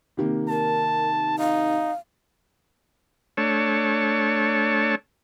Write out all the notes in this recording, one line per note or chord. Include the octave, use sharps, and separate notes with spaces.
C3 D#3 A#3
A#4 A5
D#4 F5
A3 D4 C#5 A5